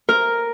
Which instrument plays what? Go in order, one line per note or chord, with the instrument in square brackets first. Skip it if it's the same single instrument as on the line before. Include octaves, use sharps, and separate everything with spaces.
[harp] A#4